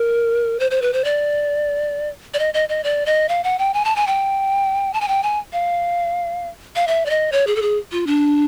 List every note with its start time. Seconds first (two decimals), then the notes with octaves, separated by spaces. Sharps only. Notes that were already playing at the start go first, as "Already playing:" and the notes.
Already playing: A#4
0.60 C5
0.71 C5
0.82 B4
0.93 C5
1.04 D5
2.34 D5
2.39 D#5
2.54 D#5
2.69 D#5
2.84 D5
3.06 D#5
3.29 F5
3.44 F#5
3.59 G5
3.74 G#5
3.85 A5
3.96 G#5
4.07 G5
4.93 A5
5.01 G#5
5.08 G5
5.23 G#5
5.53 F5
6.76 F5
6.87 E5
7.06 D5
7.10 D#5
7.32 C#5
7.47 G#4
7.56 A4
7.62 G#4
7.92 F4
8.07 D4